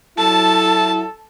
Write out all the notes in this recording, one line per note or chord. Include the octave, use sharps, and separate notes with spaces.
F#3 E4 A4 A5